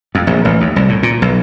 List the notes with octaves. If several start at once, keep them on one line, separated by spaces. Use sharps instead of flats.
F2
A#1
A1
D#2
C2
A2
A#2
B1